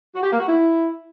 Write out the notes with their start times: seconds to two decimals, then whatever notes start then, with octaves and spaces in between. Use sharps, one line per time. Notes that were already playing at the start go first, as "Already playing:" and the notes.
0.15 F#4
0.23 G4
0.31 A#3
0.39 F#4
0.48 E4